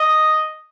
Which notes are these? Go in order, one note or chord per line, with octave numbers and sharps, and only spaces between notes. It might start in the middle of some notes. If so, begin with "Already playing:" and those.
Already playing: D#5